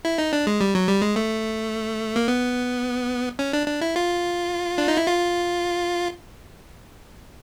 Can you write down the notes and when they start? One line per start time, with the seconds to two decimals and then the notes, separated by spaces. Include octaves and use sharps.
0.05 E4
0.18 D#4
0.33 D4
0.47 G#3
0.61 G3
0.75 F#3
0.88 G3
1.02 G#3
1.16 A3
2.16 A#3
2.28 B3
3.39 C#4
3.53 D4
3.67 D4
3.81 E4
3.96 F4
4.78 D4
4.88 D#4
4.97 E4
5.07 F4